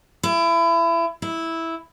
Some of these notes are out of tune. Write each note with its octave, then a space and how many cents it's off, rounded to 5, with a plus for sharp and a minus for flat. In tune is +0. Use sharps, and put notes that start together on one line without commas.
E4 +30
E4 -5